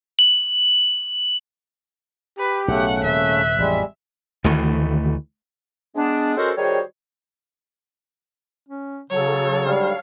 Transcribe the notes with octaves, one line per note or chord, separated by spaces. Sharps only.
F#7
G4 B4
B1 A2 C#3 A3 F#5
D#1 C3 E5 F#6
A1 F2 E3 G3 G#3
D2 D#3 E3 A3
G#3 B3 D4
G#3 C#4 F#4 A4 A#4 C5
D#3 G3 F#4 G#4 C5 C#5
C#4
C#3 F#3 A4 C#5
G#2 D3 G3 F5